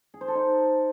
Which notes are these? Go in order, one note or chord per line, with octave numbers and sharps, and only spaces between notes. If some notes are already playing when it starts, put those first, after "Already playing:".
G#4
C5
A4
D#4